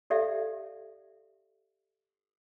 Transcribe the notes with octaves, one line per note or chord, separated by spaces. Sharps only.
G4 A4 D5 E5 F5